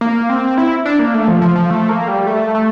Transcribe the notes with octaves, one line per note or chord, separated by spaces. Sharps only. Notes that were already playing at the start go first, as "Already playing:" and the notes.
A#3
C4
E4
D4
A#3
A3
F3
F3
F3
A3
A#3
G3
A3
A3